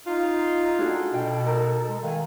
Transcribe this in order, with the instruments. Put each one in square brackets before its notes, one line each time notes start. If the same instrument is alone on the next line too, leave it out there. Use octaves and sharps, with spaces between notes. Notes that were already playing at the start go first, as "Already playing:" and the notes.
[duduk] D#4 [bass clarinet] F4
[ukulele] D4 F#4 G#4 [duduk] A4
[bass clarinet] B2 [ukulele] G5
[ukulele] D#4 A#4
[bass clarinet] G#3
[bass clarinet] D#3 [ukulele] F5 F#5 G#5